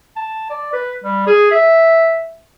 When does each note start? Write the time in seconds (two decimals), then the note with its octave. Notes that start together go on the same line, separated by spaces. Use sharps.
0.16 A5
0.50 D5
0.73 B4
1.04 G3
1.27 G#4
1.51 E5